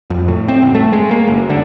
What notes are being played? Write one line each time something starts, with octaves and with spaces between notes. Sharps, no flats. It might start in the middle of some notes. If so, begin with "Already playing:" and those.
F2
A2
C4
F#1
A3
G#3
A#3
F#1
D3